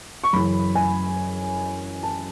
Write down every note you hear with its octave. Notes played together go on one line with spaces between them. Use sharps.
C#6
F#2 C#3 E3 B5
G#5
A5